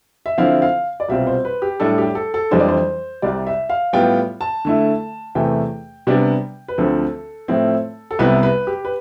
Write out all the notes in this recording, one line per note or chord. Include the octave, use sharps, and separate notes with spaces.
E5
D3 F3 C4 E4 F5
F5
D5
C2 B2 G3 C4 F4 E5
C5
B4
G4
A2 G3 D4 A4
G4
A4
A4
F2 E3 G3 D4 C5
D5
C5
C2 C3 G3 D5
E5
F5
A2 G3 B3 F4 G5
A5
D3 A3 E4
E2 C3 E3 A3 G5
C3 G3 B3 D4
B4
D2 D3 F3 C4 A4
A2 F3 A3 C4 E4
A4
C2 C3 G3 B3 E4 B4
B4
G4
B4